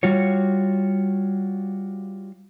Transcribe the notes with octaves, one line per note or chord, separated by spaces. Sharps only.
G3 F4 F#4 C#5